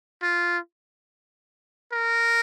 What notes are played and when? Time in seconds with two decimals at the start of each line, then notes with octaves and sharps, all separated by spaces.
0.22 F4
1.93 A#4